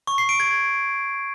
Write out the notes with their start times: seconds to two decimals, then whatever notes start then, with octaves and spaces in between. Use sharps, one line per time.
0.07 C#6
0.18 C7
0.29 D7
0.40 G#6